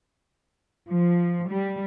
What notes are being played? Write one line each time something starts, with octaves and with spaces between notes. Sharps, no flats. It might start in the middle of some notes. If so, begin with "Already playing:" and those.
F3
G3